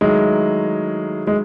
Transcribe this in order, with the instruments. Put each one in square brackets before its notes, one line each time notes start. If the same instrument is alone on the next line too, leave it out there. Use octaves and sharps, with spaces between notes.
[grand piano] D#3 F#3 A3 E4 [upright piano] G#3
[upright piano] G#3